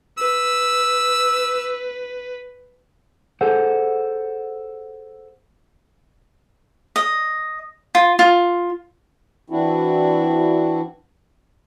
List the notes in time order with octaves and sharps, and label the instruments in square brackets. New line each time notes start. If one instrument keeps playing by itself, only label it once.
[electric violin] B4 [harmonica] E6
[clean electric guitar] G#4 A4 C5 F#5
[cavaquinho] D#5
F4
F4
[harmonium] E3 C4 D4 E4 F#4